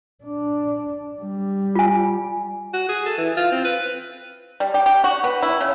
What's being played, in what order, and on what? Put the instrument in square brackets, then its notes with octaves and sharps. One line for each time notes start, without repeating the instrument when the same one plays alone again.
[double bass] D4
G3
[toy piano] F4 G#5
[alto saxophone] F#4
G#4
A4
E3
F4
C4
B4
[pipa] G3
G4
G4
F#4
B3
E4
C#3